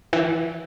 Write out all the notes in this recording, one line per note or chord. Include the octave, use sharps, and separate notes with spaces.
E3